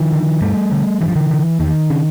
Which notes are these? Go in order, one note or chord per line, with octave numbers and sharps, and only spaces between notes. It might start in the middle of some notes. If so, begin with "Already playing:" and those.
Already playing: D#3 F3
D3
G2 G3 A3
D3
G2 E3
F3
D3 E3
D3
E2 D#3
C#3